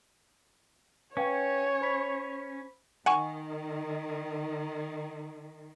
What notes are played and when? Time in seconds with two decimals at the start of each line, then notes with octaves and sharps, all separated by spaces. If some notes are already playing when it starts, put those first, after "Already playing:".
1.17 C#4 B4 C#5 F5 G5
1.81 C5 B5 B6
3.06 D#3 F#5 G#5 C#6